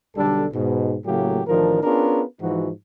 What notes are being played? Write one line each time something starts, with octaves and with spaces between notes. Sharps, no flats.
B1 D3 G3 D4 A4
G#2 B2
A2 C#3 F#3 A3 A#3 G4
A1 D#3 F3 D4 A#4
B3 C#4 D4 F4 G#4 A#4
G#2 E3 F3 D#4 F#4